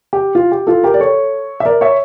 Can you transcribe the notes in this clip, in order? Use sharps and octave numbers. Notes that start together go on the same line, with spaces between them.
G4
F4
G4
F4 A4
G4 A#4
D5
A4 C#5
E5
A#4 D5
C#5 E5